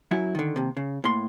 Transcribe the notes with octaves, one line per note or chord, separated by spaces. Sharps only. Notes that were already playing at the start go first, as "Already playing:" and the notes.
F#2 F#3 E4
D3 D#3
D#2 C3
C#3
A2 A#3 C6